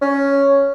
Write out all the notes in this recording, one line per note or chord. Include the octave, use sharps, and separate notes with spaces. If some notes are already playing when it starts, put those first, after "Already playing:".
C#4